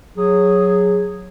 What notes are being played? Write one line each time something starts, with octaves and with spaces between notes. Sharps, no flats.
F#3 G#4